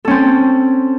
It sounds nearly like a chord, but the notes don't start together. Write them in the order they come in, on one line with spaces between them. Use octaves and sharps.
A4 C#4 C4